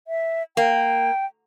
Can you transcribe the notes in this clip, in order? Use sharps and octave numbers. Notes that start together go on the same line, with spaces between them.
E5
A#3 G5